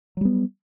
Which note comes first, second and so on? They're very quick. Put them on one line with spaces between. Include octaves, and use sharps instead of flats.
F#3 G3 B3